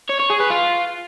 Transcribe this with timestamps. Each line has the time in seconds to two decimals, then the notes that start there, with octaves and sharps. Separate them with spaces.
0.10 C#5
0.20 C#5
0.30 G#4
0.40 B4
0.50 F4